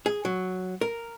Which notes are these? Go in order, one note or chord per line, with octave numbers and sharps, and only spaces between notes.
G#4
F#3
A#4